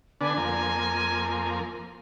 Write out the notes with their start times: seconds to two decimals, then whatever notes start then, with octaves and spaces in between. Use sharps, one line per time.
0.21 D3 B3 D4 G#5
0.37 F2 A#3